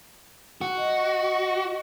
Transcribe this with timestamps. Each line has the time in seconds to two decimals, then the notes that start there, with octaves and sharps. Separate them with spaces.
0.61 F#4
0.78 D#5